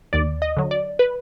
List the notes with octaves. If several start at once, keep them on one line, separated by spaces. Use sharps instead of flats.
D#2 D5
D#5
D3 F#3
D5
B4